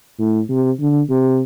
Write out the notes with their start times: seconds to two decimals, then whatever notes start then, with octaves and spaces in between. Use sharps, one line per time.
0.19 A2
0.49 C3
0.80 D3
1.10 C3